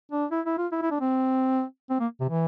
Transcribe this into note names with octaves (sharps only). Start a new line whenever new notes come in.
D4
E4
E4
F4
E4
E4
D4
C4
C4
A#3
C3
E3